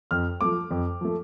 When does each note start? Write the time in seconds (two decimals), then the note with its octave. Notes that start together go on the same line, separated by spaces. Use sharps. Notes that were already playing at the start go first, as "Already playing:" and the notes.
0.11 F2 F6
0.41 F3 A3 D6
0.71 F2
1.01 F3 A3